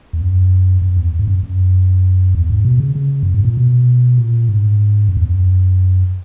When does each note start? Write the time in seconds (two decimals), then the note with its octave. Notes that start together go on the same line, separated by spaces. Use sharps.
0.13 E2
0.21 F#2
0.82 F#2
0.97 E2
1.19 G#2
1.27 F#2
1.43 F#2
2.35 E2
2.50 G#2
2.65 B2
2.80 C#3
2.95 C#3
3.23 F#2
3.34 G#2
3.45 A#2
3.57 B2
4.18 A#2
4.49 G#2
5.09 F#2
5.17 E2
5.25 F#2